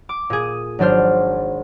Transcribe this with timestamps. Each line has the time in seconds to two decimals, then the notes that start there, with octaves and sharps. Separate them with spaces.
0.09 D6
0.30 A#2 G#4
0.43 D#6
0.79 G#1 F#3 D4 C5 F6